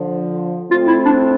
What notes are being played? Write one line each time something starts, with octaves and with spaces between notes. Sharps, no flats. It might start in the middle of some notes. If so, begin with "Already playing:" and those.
Already playing: D3 F3
A3 C4 F4
E4
D4